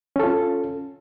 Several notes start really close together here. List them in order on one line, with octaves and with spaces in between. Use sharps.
C#4 A4 F4